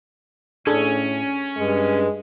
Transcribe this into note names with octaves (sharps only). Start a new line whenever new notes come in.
A2 C#4 D4 G#4 A4
G2 G#3